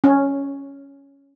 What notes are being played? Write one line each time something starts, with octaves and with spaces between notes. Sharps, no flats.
C#4